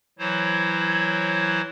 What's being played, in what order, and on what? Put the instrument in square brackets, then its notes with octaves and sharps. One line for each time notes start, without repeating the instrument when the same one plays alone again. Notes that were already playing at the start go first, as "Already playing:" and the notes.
[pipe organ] E3 F#3 E4 C5 C#5